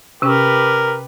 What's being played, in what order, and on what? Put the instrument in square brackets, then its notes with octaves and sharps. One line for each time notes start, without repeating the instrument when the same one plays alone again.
[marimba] C3 C#4 [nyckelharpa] G4 B4 [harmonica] A#4